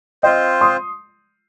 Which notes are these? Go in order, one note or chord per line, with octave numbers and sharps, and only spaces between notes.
C4 F4 C5 D#5 G5
C6 D#6